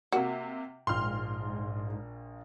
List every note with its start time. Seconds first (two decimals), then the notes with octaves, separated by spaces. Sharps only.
0.12 C3 A#3 F#4
0.87 A#1 G#2 F4 G5 C6 F6